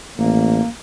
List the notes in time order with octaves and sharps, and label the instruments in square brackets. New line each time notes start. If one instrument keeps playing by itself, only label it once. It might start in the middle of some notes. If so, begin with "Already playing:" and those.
[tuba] A1 [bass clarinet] A#3